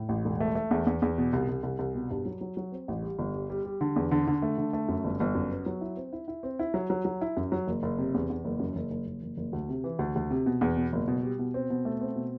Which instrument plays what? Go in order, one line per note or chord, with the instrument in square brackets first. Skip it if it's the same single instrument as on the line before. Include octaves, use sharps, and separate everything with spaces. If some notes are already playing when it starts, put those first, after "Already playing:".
Already playing: [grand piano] A2
A1
E1
A3
A3
E2
E2
E2
B2
C2
C2
C2
C2
B2
G2
F#3
F#3
F#3
C4
A1
G3
G1
G3
G3
G3
D3
E2
D3
D3
A3
D3
A3
F#2
G1
G1
F#2
B3
F#3
E4
C4
E4
E4
C4
E4
F#3
F#3
F#3
E4
F#2
F#3
F#1
F#1
C3
E2
E2
F#1
F#2
F#1
F#1
F#1
F#1
F#1
D2
C3
E3
D2
D2
C3
B2
E2
B2
F#1
B2
G3
B2
C4
B2
A3
C4
B2